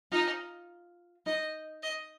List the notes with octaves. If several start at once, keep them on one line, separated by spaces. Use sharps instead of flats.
D#4 F4
D#4 D#5
D#5